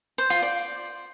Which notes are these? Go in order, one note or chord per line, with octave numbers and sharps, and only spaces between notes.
C5
F4
D5